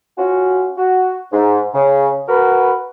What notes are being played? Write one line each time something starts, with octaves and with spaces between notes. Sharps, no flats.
C#4 F4 F#4
F#4
G#2
C#3
F#4 A#4 B4